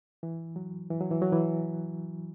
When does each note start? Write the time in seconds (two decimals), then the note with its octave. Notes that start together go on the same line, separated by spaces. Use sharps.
0.23 E3
0.56 F#3
0.90 E3
1.01 F#3
1.11 E3
1.22 F#3
1.32 E3